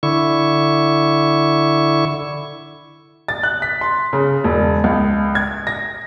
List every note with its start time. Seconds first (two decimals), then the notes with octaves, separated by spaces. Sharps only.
0.03 D3 E4 C#6
3.28 A6
3.43 F#6
3.62 B6
3.81 C6
4.13 C#3
4.44 E1
4.84 C#2
5.35 G#6
5.67 A#6